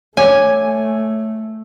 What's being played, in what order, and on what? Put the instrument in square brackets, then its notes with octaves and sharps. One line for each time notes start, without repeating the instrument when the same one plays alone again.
[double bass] A3 [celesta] C#5 D6 [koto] G#5